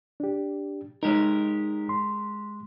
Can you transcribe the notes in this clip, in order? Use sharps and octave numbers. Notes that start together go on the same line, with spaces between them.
D4 G4
G#3 D#4 G4 A#4 C#5
C6